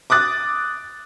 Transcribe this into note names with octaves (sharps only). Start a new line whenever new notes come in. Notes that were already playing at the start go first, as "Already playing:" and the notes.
D6 D#6 F#6 A6